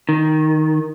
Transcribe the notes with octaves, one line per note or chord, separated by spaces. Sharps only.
D#3